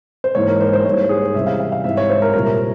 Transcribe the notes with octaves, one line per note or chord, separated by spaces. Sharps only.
C5
G#2 E3 A#3 C#5
A#4
C5
C5
G#2 G3 A#3 E4 C#5
C5
G#4
C5
E2 C3 E3 G3 C#4 E5
F5
F5
F5
G#2 G3 C4 E4 E5
C#5
C5
A#4
C2 A#2 G3 C4 A#4